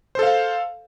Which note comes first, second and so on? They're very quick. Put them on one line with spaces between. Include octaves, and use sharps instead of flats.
C5 A4 F5